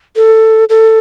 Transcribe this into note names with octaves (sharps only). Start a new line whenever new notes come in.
A4
A4